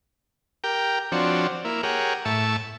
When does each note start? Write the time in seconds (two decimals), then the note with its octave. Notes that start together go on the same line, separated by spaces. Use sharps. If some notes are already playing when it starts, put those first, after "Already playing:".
0.64 G4 A#4 G5
1.12 F3 C4 D4 F#4 C#5
1.65 A#3 E4
1.83 G4 G#4 A#4 C#5 F#5
2.25 A2 E5 A5 C#6